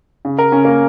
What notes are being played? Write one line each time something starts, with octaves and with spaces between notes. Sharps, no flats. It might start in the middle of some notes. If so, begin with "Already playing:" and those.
C#3
A#4
C#3 C#4
A#3